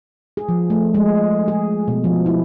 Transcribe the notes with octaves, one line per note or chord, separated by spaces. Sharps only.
G#4
F3
A3
G#3
G#4
B2
F3
E4